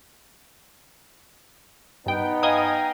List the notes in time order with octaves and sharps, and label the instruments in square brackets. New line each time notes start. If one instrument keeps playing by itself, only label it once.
[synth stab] G2 G5 [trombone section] B3 D#4
[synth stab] D#5 G#5 D#6 [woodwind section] F5 G5 A#5